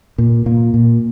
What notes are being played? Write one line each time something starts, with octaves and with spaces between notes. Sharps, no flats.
A#2
A#2 A#3
A#2